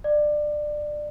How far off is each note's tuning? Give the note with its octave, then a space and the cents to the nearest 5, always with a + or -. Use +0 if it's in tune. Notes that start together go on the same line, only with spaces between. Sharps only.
D5 +20